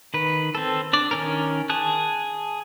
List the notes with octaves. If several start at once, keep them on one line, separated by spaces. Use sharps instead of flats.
D#3 B4
C4 A4
D4 D5
D#3 C#4 A#4
G#4 A5 F#6